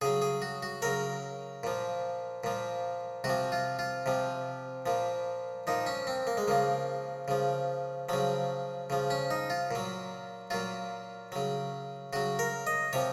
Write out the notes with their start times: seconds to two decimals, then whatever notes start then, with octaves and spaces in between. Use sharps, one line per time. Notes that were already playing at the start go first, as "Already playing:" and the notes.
0.01 C#3 F#3 G#4
0.22 G#4
0.42 F#4
0.63 F#4
0.82 C#3 F#3 A#4
1.63 A#2 F3
2.44 A#2 F3
3.24 C3 F#4
3.29 F3
3.52 F4
3.79 F4
4.06 C3 F3
4.86 A#2 F3
5.67 A#2 F3 D#4
5.86 C#4
6.07 C4
6.27 A#3
6.37 G#3
6.48 C#3 F3 A#3
7.28 C#3 F3
8.09 C#3 F3 F#3
8.90 C#3 F3
9.10 C#4
9.31 D#4
9.50 F4
9.71 A#2 F#3
10.50 A#2 F#3 F4
11.32 C#3 F#3
12.13 C#3 F#3 F#4
12.39 A#4
12.67 D#5
12.93 C3 F3 C#5